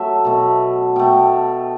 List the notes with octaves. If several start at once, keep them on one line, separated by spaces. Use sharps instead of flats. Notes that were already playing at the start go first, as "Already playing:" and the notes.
Already playing: F#3 A3 E5
B2 A3
B2 A3 G5